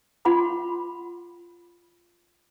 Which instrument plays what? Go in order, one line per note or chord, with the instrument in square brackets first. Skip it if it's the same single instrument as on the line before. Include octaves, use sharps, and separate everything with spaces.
[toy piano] F4 F#5 B5 C6 D6